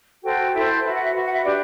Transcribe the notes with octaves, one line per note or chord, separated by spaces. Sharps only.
F#4 A4 C5 G5
E4 A4 C5
F#4 B4 E5
F#5
E5
F#4 B4
F#5
E5
D4 G4 B4 D5